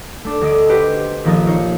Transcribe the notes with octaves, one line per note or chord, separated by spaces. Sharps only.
A3 D4
D2 D#5 D#6 D7
F#4 G4 B4 C5 D#5
A#1 D#3 F3 A#4 D#6 A6
A#3 D#4 F4 C#5